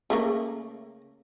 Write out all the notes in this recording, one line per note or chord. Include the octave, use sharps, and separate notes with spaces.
C#3 A3 A#3